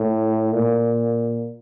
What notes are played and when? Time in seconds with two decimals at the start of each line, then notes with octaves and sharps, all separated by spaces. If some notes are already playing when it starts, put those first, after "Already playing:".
Already playing: A2
0.53 A#2